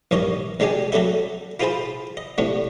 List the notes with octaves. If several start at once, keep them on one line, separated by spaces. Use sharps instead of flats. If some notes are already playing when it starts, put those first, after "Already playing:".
A#1 G2 D#3 C#5 D#5
D2 G#3 D4 G4 D5 G#5
F#3 A3 C#4 A4 E5
E4 F4 G#4 C5 A5 B5
D#5
A2 C3 A3 D4